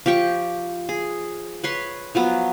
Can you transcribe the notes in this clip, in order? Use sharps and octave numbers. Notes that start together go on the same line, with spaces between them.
F3 G4 G5 C#6
G#4
B4 C#5 C6
F3 F#3 B3